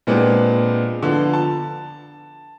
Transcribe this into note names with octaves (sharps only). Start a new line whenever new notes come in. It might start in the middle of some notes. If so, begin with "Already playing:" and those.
A#2 G#3 B3 C4 D4 G4
D3 F3 B3
A5